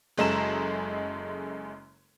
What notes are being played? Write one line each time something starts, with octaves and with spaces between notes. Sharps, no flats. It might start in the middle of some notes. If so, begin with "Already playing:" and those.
F#1 F#2 G#3 A4 A#5 E7